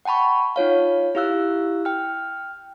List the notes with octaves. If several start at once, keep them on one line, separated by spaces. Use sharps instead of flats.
F#5 G5 A5 B5 C#6
D#4 F4 C#5 F5
E4 G4 F5 E6 F#6
G5 F6